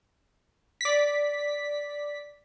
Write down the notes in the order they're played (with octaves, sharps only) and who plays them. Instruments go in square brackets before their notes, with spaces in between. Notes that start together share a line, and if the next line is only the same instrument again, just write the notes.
[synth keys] D5 B6